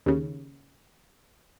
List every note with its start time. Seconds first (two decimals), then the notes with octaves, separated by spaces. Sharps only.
0.06 D#2 C#3